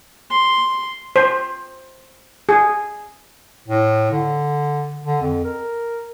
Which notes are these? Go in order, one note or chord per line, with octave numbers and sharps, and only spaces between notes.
C6
C5
G#4
A2
D3
D3
F2
A#4